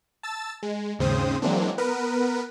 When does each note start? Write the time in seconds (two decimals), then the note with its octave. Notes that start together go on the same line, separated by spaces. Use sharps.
0.23 A5 E6 A6
0.63 G#3
0.99 D#2 G#2 C#3 C4 C5 D#6
1.42 E3 F#3 G#3 A#3 C4 D4
1.78 B3 A#4 B4